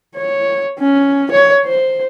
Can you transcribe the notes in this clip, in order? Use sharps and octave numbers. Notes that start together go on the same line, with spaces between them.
C#5
C#4
C#5
C5